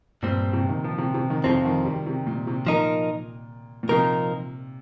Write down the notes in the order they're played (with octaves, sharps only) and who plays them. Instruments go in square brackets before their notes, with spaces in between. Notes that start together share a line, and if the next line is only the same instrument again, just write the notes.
[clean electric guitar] G2 G3 C4 [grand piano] A#2
[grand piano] C3
D#3
F3
C3
C3
D#3
[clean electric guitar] F2 F3 C4 [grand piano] C3
[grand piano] D#3
G3
C3
A#2
C3
[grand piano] A#2 [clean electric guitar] F3 D#4 A#4
[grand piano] A#2
[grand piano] C3 [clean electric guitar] F3 D#4 A#4